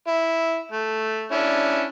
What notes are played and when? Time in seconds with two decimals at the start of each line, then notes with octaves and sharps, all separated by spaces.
0.08 E4
0.72 A3
1.32 C#4 D4 E4